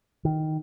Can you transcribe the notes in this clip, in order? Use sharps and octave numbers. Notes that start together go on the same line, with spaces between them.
D#3